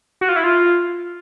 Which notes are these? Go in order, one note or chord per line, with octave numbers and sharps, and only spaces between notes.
F#4
F4
E4
F4